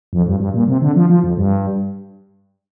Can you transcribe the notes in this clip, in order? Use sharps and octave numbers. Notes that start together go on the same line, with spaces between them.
F2
G2
G2
A#2
C3
D3
F3
F3
F2
G2